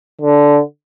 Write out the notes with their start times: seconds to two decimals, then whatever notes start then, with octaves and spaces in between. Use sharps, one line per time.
0.21 D3